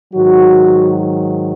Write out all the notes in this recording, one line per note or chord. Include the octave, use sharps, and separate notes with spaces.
G#2 D#3 F#3 F#4